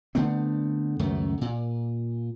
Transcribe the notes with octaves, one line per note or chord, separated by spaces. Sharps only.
D3 A3 B3 C4
C#2 F#2 D#3 A3
A#2